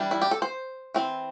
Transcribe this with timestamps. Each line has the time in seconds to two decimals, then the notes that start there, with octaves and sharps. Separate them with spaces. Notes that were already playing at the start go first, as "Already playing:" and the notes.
Already playing: E3 G3 D4
0.11 E4
0.22 G4
0.31 A4
0.42 C5
0.94 E3 C4